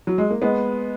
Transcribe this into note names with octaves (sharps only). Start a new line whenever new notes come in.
F#3
G#3
A#3
G#3 B3